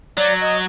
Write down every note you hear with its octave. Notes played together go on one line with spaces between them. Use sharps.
F#3 D5
D#5